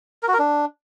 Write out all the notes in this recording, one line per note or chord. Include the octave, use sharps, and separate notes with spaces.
A#4
F#4
A#4
D4